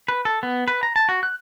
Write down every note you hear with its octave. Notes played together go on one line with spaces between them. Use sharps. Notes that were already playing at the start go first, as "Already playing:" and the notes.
B4
A4
B3
B4
A#5
A5
F#4
F#6